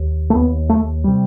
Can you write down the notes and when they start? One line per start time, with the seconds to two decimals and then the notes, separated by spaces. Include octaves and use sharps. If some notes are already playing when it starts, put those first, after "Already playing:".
Already playing: D#2
0.30 A3
0.35 D#2 B3
0.69 A3
1.04 C3 G3